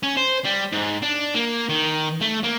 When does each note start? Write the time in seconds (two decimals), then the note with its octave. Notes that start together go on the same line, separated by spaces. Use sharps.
0.03 C#4
0.17 C5
0.44 G3
0.72 G#2
1.02 D4
1.35 A#3
1.69 D#3
2.21 A3
2.43 A#3